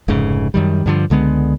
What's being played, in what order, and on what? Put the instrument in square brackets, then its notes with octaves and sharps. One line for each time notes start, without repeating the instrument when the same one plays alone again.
[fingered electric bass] F1 G#2 C#3
F#2 D#3 G3
G2 D3 F3
C#2 D3 G#3 B3